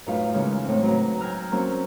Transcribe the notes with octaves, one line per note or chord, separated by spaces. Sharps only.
F#2 A2 D#4 F4 B4 F5
C#3 E3 G#3 A#3 D#4
A2 C4
F#3 B4 A#5
G5 G#5 A#5 F6 F#6
F#3 A#3 C4 C#4